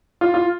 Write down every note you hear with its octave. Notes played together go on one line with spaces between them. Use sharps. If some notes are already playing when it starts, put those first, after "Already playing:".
F4
F4